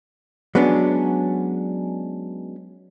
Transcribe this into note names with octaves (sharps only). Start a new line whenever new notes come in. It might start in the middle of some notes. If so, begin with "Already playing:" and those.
F#3 G#3 B3 C#4 D4